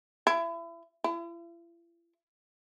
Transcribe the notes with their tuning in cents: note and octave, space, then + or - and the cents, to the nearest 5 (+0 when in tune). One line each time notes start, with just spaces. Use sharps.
E4 +30
E4 +45